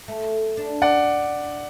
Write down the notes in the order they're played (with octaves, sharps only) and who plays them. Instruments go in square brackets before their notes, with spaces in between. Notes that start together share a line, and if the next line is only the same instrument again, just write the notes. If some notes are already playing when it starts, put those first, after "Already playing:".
[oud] A3
D4
[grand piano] D5 F#5